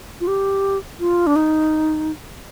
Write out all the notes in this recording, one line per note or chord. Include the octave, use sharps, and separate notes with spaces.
F4
G4
F4
D4
D#4